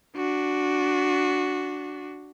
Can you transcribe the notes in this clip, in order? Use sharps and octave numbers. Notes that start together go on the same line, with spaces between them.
D4 F#4